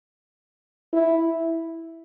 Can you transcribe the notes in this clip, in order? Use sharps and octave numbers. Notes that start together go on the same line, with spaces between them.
E4